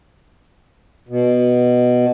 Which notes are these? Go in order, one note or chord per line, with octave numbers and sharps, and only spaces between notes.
B2